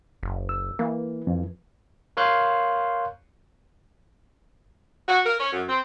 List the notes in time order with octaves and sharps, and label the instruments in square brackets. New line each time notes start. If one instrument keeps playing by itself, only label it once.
[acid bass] F#1
[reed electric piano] E6
[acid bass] E3 [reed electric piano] A#3
[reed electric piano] F2
[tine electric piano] A#4 C#5 F5 C6 F#6 G6
[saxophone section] F#4
A#4
C#4
F#2
C4